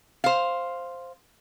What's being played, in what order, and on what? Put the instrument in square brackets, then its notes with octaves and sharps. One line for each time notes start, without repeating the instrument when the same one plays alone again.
[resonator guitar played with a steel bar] C5 F5